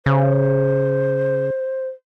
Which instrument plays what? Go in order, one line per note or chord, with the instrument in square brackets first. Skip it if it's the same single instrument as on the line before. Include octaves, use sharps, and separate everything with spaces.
[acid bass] C#3 [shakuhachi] C5